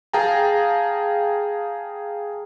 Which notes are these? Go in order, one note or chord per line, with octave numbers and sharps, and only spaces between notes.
G#4 F5 G5 A5 A#5